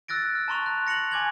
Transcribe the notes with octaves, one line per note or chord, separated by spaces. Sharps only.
E6 F#6 A6 A#6 D7
F6
A5 A#5 C6 C#6 F7
A#5 F#6
A#6 C#7 F7 F#7
G#5 D6 G#6 F#7